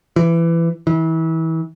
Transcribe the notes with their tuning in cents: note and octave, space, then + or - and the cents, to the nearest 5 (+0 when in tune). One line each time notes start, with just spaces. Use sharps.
E3 +20
E3 -30